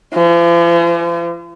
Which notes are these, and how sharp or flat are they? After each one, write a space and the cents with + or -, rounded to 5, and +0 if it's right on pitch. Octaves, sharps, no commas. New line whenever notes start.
F3 -45